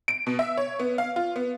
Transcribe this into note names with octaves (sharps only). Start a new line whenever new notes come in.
D7
B2
E5
C#5
B3
F5
F4
B3